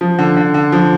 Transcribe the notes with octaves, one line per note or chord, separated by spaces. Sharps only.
F3
D3
D3
D3
F3